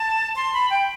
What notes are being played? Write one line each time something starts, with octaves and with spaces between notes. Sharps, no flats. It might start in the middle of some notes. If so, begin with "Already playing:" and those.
Already playing: A5
C6
B5
G5